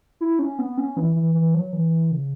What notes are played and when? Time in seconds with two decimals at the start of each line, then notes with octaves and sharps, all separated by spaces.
0.21 E4
0.39 C#4
0.59 B3
0.77 C#4
0.97 E3
1.16 E3
1.34 E3
1.54 F#3
1.73 E3
2.11 C#3